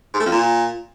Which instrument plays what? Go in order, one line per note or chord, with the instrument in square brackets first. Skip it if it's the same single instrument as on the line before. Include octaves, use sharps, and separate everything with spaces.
[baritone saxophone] G#2
A3
F2
A#2